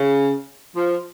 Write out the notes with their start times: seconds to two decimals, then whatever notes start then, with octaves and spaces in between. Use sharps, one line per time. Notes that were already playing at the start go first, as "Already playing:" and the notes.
Already playing: C#3
0.75 F3